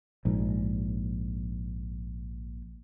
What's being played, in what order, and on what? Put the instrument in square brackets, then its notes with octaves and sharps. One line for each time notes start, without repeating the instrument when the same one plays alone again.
[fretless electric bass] A#1 G#2